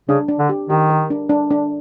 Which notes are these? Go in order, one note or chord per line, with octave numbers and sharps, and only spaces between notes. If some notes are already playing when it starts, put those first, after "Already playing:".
C#3 D4
D4
D3
G4
D#3 G4
A#4
D4
D4
D4